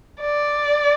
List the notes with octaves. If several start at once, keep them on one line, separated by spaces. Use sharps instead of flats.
D5